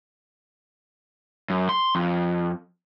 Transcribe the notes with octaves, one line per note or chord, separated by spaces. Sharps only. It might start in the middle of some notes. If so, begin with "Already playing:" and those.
F#2
C6
F2